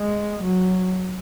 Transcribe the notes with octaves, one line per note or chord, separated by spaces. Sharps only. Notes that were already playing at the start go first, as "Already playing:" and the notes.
Already playing: G#3
F#3